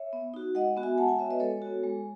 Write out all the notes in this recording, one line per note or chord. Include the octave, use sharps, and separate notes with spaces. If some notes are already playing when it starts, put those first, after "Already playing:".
Already playing: C#5 E5
B3
D#4 F#4
G#3 D#5 F#5
B3 F#4
E5 G#5
G#3 F#5 A5
E5 G#5
B3 F#4 C#5 E5
B4 D#5
G#3 A4 C#5
B3 F#4
G#3